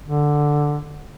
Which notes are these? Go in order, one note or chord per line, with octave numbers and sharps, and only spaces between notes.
D3